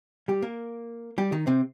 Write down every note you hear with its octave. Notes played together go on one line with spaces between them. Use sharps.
G3 G4
A#3 A#4
G3 G4
D#3 D#4
C3 C4